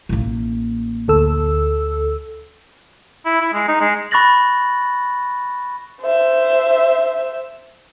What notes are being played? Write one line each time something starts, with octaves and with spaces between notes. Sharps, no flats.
A1 A#3
D2 A4 E6
E4
E4
G#3
D#4
G#3
B5 C#6 F#6 A6 A#6 F#7
C5 E5